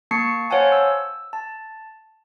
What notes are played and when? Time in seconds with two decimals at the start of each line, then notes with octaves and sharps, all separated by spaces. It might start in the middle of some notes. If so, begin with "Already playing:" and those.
0.11 A#3 A5 C#6 C7 C#7
0.50 C5 C#5 F5 F#5 G#5 A5
0.72 E6
1.33 A5